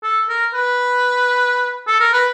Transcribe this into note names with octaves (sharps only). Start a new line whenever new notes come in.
A4
A#4
B4
A4
A#4
B4